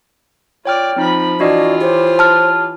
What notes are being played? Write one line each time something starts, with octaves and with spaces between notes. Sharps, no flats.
F4 C#5 D5 G5 F6
F3 C4 D#4 B5
E3 D4 F4 F#4 D5 D#5
G4 C5 C#5
A5 F6